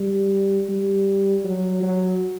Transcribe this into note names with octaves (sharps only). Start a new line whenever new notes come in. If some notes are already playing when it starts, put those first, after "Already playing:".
Already playing: G3
G3
F#3
F#3